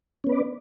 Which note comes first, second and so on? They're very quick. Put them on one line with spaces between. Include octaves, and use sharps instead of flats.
C#4 B3 B4 D5